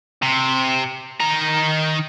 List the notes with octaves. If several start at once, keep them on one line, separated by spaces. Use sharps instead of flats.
C3
D#3 A#5